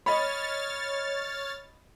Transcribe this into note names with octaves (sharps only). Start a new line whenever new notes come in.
C#5 D#5 B5 F6 A6